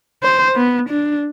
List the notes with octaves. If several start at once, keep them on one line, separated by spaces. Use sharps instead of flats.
C5
B3
D4